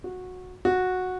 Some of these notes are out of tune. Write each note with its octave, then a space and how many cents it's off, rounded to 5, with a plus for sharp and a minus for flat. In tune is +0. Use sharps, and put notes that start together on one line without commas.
F#4 -15
F#4 -10